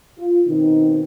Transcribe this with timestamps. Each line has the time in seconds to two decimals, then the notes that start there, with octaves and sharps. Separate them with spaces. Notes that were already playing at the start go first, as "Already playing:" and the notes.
0.19 F4
0.47 B2 D#3 C4 D#4